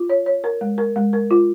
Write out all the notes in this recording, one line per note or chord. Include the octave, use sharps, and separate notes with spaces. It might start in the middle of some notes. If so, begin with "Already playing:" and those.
Already playing: F4
C#5
C#5
A#4
G#3
A#4
G#3
A#4
F4